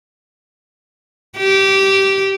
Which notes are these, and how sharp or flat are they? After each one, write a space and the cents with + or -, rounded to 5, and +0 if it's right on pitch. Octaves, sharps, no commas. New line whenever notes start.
G4 -15